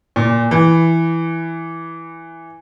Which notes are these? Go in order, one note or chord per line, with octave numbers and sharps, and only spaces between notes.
A#2
E3